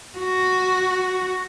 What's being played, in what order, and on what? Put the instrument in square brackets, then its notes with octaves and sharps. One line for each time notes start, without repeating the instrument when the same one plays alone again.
[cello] F#4